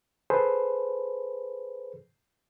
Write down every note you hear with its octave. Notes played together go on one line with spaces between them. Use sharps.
G#4 A4 B4 C5